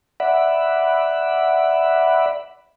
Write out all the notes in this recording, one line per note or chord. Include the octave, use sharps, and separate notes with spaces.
D5 E5 F#5 B5